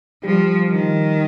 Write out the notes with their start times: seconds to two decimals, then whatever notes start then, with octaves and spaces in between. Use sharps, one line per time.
0.24 F3 G3 G4
0.68 D#3